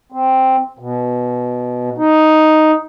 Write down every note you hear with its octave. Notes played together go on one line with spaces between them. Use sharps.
C4
B2
D#4